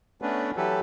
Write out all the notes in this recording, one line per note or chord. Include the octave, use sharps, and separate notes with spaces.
A3 B3 C#4 D4 B4
E3 F#3 G4 A4 B4